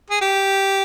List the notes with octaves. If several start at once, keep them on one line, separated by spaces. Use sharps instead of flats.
G#4
G4